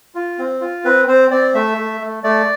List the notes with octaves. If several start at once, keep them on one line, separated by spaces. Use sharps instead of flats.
F4
C4
F4
C4 B4
C4 C5
C4 D5
A3 E5
A3
A3
A3 D5